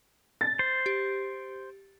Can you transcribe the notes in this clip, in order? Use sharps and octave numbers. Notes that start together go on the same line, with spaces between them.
A6
C5
G4